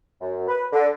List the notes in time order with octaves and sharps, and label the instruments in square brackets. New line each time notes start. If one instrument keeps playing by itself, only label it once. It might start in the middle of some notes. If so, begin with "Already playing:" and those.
[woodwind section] F#2
B4
D3